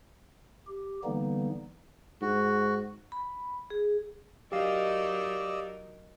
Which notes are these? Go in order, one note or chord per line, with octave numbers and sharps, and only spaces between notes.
G4
D3 E3 G3 A#3 B3 D#4
G#2 F#4
B5
G#4
F#3 D#4 G4 A#4 D5 D#5 F5 E6